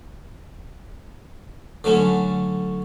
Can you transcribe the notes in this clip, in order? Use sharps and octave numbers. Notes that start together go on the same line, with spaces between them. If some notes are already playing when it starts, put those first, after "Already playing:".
D3 F#3 A3 C#4